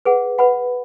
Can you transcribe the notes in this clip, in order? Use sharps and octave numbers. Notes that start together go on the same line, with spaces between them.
G#4 B4 F#5
B4 F#5 B5